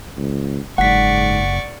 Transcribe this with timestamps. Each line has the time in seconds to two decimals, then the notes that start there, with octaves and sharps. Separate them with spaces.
0.17 C#2
0.78 F#1 G#2 D5 F#5 C#6 B6